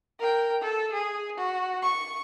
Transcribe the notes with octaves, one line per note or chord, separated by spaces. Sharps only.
A#4 G5
A4
G#4
F#4
C#6